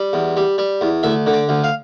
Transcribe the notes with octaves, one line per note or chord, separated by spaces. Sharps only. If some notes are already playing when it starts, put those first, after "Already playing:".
Already playing: G3
E2
G3
G3
E2
D2 E5
D3
D5
D2
F5